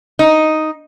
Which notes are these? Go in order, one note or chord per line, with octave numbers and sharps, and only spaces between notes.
D#4